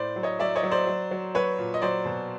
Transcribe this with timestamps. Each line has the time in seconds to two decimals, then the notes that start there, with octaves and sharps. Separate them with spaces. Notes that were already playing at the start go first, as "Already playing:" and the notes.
Already playing: A2 C5 D5
0.16 F#3
0.23 C#5 D#5
0.39 F#3 D5 E5
0.56 C#5 D#5
0.63 F#3
0.71 C5 D5
0.87 F#3
1.11 F#3
1.35 F#3 B4 C#5
1.59 A#2
1.74 D#5
1.82 F#3 C5 D5
2.05 B2